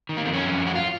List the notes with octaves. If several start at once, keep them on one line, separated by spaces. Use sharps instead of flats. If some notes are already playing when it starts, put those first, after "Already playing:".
D#3
A#3
F2 C4
C#4
F2
F2
F#4
F4